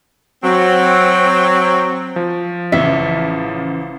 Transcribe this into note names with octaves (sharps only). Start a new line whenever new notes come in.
F#3 C4
F3
A1 C#3 E5